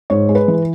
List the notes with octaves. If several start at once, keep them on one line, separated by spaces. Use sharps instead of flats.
G#2 C#5
G#3
B4
E3